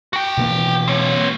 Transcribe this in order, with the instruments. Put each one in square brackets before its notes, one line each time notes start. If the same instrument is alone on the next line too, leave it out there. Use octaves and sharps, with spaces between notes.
[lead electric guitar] F#4 G5
[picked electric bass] B2 E3 A#3
[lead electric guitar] C4 C#5